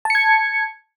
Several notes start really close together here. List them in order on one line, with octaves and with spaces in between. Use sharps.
A5 C#7 G#6